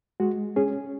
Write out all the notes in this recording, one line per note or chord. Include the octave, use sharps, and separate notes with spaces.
G#3 F#4
C#4 G#4